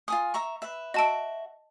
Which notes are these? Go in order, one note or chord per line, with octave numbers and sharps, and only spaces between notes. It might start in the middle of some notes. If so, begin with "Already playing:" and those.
F4 G#5 D#6
E5 A#5 C#6
B4 E5
F#4 D#5 E5 A5 D7